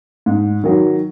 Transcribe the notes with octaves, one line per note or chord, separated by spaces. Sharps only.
G#2
D#3 F#3